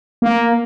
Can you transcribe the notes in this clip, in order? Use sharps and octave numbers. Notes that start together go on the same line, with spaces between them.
A#3